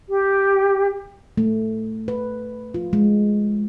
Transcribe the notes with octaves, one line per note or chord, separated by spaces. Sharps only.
G4
A3
B4
F4
G#3